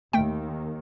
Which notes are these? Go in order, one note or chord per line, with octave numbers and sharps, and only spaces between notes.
D#2 D#3 A3 G5